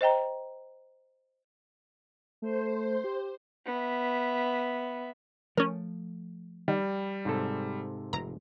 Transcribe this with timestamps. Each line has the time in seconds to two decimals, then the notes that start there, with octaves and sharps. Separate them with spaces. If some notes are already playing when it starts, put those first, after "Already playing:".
0.01 C5 D#5 G5 A#5
2.42 A3 C5
3.04 G4
3.66 B3 E5
5.57 F3 A3 C#4 A#4
6.68 D#3 G3
7.25 G#2 C3 A4
8.13 F1 A#5